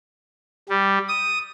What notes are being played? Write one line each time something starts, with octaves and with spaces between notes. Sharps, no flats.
G3
D#6